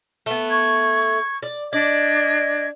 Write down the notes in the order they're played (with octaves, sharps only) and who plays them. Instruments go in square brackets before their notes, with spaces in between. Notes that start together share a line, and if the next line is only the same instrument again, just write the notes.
[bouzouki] A3 B3
[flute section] C#6 G#6
[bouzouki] D5
[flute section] D4 D#5 G#6 [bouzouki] D5